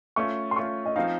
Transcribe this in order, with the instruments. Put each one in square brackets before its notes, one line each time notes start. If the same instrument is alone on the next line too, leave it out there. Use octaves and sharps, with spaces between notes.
[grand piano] A3 C#4 F4 [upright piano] C#6
[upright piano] C6
[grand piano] A3 C#4 F4 [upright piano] C#6
[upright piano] D#5
[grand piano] F3 C4 D#4 [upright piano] F5